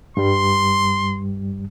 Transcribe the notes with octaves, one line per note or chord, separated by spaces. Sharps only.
G2 G3 C6